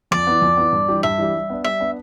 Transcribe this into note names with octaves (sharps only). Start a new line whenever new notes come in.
F2 D5
E3 B3
F2
E3 B3
G2
E3 G3 D4 G4
G2 E5
E3 G3 D4 G4
G3
B3 D4
G3 E5
B3 D4